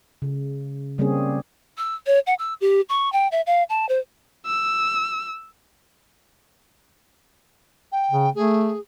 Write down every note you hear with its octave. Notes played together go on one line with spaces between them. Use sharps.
C#3
C#3 G3 A#3 C4 C#4 G#4
E6
C#5
F#5
E6
G4
C#6
G5
E5
F5
A5
C5
E6
G5
C#3
A3 G#4